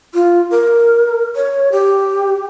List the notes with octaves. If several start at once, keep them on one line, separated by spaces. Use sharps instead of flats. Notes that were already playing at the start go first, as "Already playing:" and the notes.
F4
A#4
C#5
G4